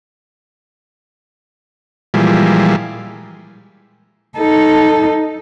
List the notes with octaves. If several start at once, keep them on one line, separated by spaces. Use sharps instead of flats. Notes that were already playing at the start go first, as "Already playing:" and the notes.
A#2 E3 F3 G3 G#3
D#4 A4